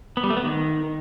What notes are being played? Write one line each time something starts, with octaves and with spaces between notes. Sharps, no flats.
B3
G3
A3
B3
D#3